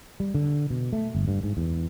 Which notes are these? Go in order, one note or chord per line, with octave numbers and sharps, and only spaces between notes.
G3
D3
B2
A3
G1
G2
G#2
E2